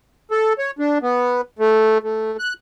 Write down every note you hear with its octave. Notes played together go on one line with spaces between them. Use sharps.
A4
C#5
D4
B3
A3
A3
F#6